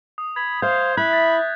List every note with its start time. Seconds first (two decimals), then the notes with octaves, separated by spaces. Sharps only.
0.18 D#6
0.36 B5 G#6
0.62 C5 F5 G6
0.97 E4 B5 F#6
1.11 A6 B6